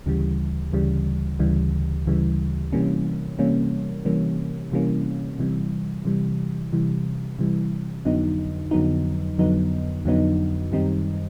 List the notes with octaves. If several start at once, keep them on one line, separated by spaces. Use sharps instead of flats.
D2 C#3 E3 G3
D2 C#3 E3 G3
D2 C#3 E3 G3
D2 C#3 E3 G3
C3 E3 G3 A#3 C#4
C3 E3 G3 A#3 C#4
C3 E3 G3 A#3 C#4
C3 E3 G3 A#3 C#4
C3 E3 G3
C3 E3 G3
C3 E3 G3
C3 E3 G3
F2 D3 F#3 B3 D#4
F2 D3 F#3 B3 D#4
F2 D3 F#3 B3 D#4
F2 D3 F#3 B3 D#4
F#2 D#3 G3 C4 D#4